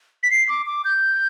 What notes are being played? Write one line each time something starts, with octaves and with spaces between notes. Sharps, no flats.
B6
C7
D6
D6
G6